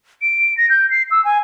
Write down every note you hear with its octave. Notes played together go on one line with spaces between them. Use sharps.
D7
A#6
G6
C7
E6
G#5